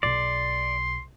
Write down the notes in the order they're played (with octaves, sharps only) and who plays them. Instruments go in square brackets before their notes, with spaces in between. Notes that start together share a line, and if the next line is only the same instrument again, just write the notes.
[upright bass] B1 [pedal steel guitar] D5 [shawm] C6